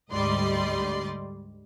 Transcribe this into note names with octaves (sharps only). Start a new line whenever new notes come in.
D2 G#2 G3 D5 D#5 C6